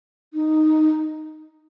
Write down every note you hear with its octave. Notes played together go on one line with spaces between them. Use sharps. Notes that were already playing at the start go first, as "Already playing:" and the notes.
D#4